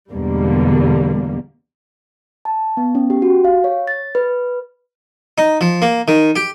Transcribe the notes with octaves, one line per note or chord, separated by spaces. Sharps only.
E2 G#2 B2 D3 G3 A#3
A5
B3
C#4
G4
F#4
F5
C#5
A6
B4
D#4
F3
A#3
D#3
G4